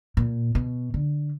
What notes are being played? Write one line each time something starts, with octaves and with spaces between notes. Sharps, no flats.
A#2
B2
D3